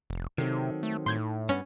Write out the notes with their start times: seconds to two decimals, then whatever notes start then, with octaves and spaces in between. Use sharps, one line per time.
0.10 F1
0.38 C3 D#3 F#3 C4 D#4 A4
0.83 A3
1.06 A2 C6 G6 G#6
1.49 G2 B3 C#4